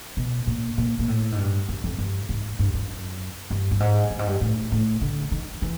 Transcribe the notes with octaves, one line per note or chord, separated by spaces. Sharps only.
B2
A#2
A#2
A#2
A2
G#2
G2
F#2
F2
G2
G#2
G2
F#2
G2
G2
G#2
G2
G#2
G2
A2
A2
D3
D#3
E3